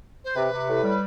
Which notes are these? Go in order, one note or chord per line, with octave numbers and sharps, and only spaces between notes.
C5
C3 B4
C3
A2
G3